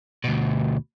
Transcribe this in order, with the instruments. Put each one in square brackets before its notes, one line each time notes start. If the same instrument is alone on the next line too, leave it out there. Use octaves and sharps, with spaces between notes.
[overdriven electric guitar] D2 B2